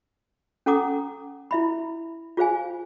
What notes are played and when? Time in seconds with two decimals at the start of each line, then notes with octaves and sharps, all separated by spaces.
0.66 C#4 A4 F#5 A#5 D6 D#6
1.51 E4 E5 B5
2.37 F4 G#4 C5 F5 G#5